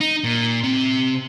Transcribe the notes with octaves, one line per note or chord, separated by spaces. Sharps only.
D#4
A#2
C3